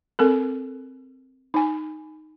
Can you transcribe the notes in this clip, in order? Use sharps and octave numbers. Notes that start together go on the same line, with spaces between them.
C4 A4 A#4
D#4 G#5